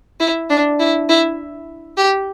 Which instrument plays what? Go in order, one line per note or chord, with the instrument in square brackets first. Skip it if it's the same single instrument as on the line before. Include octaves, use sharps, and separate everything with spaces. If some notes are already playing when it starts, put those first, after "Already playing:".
[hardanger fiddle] E4
D4
E4
E4
G4